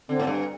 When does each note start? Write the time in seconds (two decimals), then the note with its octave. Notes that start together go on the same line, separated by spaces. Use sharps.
0.09 D3 C4
0.19 A2
0.27 G2